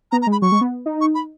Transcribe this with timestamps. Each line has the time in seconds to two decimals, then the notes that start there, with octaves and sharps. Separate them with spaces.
0.12 B3 A#5
0.22 A#5
0.27 G#3
0.32 B5
0.42 F#3 C#6
0.52 G#3
0.61 B3
0.86 D#4
1.01 C#6
1.15 B5